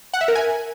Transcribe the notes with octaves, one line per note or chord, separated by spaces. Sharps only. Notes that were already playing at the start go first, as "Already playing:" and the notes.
F#5
E5
A#4
G#5